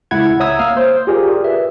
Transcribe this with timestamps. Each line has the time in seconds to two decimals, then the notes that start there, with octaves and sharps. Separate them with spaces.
0.11 C#2 E4 F#5 G#6
0.40 C#5 E5 A#5 D#6 E6 G#6
0.59 A#3 F5 F6
0.77 C5
1.07 F4 G4 G#4 A#4 D5
1.44 B4 E5